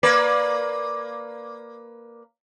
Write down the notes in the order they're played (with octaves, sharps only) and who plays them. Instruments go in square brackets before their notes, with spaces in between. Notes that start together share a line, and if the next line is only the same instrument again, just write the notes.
[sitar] A#3 B4 D5